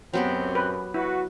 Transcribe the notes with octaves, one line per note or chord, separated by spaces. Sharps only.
F#2 F#3 B3 C4 G4
B4
E4 F#4 B4